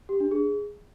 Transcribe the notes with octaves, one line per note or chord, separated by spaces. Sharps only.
G4
D4
G#4